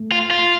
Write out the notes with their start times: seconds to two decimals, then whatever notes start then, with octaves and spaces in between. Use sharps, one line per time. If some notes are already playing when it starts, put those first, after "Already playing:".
Already playing: A3
0.12 F4
0.31 F4